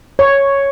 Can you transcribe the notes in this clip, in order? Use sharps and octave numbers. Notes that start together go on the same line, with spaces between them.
C#5